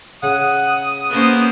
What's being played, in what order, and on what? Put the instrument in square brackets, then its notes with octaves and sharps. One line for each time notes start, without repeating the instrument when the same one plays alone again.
[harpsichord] C#3 [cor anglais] F#5 [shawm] D#6
[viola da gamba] A#3 C#4 C5 [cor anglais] B3